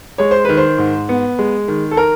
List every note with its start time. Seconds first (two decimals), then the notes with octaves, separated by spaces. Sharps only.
0.18 G#3 C#5
0.31 C5
0.45 D#3 B4
0.57 C5
0.78 G#2
1.09 B3
1.39 G#3
1.68 D#3
1.91 A4
1.97 A#4